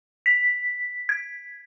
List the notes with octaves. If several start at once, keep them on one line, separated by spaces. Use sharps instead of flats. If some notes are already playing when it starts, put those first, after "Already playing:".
B6
G#6